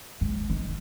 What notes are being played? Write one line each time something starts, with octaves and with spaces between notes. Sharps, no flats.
G#2
D#3